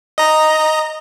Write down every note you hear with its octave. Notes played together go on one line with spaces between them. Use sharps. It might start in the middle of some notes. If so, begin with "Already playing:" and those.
D#5 A#5